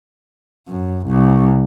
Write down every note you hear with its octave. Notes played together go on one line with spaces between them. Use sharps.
F#2
C2